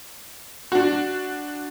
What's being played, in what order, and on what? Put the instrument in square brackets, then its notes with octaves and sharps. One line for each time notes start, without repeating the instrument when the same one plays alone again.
[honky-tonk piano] D4 F#4